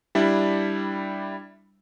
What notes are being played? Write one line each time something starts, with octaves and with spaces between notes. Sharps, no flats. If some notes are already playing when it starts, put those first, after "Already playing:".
G3 D4 E4